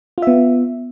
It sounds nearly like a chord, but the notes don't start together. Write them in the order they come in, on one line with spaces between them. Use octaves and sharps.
F4 E5 B3